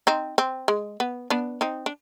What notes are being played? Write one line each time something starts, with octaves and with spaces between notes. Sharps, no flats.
C4 D#4
C4
G#3
B3
B3 D4
C4 D#4
D4